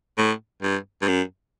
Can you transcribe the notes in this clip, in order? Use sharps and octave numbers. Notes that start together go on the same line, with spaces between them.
A2
G2
G2
F#2